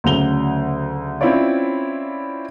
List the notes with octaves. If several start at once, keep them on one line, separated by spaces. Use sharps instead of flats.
D2 C#3 F#3 F7 G7
C4 C#4 E4 F4 C#5 D5